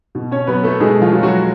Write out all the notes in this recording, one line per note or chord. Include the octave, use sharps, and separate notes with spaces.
B2
C#4 C#5
F#3 B3 B4
A3 A4
B2 G#3 G#4
F3 F4
F#3
F#3 F#4